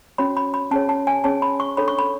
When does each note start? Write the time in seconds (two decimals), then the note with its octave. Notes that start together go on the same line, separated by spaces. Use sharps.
0.18 C#4 F#4 C#5 B5
0.37 B5
0.54 B5
0.71 C#4 G#4 C#5 A5
0.89 A5
1.07 G#5
1.24 C#4 G#4 C#5 A5
1.42 B5
1.60 C#6
1.77 D4 A4 C#5 B5
1.88 C#6
1.99 B5